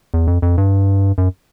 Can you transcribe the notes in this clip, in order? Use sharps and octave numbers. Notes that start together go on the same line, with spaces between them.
E2
F2
F2
G2
F#2